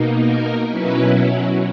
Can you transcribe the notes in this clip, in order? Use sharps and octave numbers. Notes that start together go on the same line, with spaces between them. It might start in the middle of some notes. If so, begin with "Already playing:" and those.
Already playing: B2 A#3 D#4
A#4
B2 F#3 C#4 E4 B4